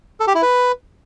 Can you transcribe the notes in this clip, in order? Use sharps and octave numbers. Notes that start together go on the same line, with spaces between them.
A4
G4
E4
B4